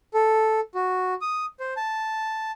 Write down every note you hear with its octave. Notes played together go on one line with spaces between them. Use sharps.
A4
F#4
D#6
C5
A5